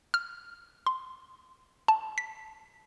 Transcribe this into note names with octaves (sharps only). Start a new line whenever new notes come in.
F6
C6
A5
B6